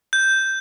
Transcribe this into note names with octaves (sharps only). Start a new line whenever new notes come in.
G6